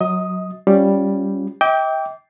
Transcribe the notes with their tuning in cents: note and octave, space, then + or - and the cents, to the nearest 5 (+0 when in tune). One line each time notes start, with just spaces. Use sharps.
F#3 +0 D#5 +35 D#6 +0
G3 +0 C#4 +0 F4 +10
D#5 +45 G5 +0 D6 -25